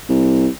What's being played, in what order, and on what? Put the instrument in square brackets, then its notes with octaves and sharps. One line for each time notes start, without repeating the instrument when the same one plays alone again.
[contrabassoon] C2